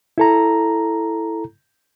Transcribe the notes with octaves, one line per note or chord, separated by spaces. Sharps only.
E4 A4 A#5